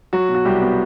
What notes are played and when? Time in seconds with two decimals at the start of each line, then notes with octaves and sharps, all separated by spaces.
0.13 F#3 F#4
0.29 B2
0.35 F#4
0.45 C2 G3 G4
0.62 B3